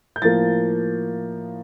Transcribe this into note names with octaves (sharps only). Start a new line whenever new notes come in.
G6
A2 F3 A#3 A6